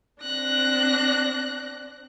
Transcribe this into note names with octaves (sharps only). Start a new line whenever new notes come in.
C4 D4 F#6 A#6